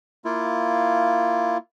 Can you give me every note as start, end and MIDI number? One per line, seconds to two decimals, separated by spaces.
0.25 1.57 58
0.25 1.57 64
0.25 1.57 65